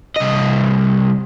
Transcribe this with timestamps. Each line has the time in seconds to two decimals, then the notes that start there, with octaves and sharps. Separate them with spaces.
0.16 C2 D#5